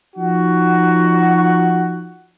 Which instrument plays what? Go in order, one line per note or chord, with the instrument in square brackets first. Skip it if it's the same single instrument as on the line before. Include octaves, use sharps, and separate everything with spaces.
[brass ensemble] F3 D#4 F#4